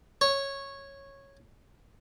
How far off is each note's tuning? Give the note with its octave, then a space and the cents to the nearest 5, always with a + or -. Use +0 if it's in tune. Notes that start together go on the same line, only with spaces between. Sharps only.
C#5 -10